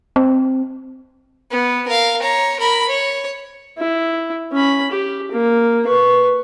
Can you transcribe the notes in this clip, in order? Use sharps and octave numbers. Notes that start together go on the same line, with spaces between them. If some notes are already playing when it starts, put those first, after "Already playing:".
C4
B3
A#4 F5
C#5 A#5
A#4 B5
C#5
E4
C#4 B5
G4
A#3
B4 C#6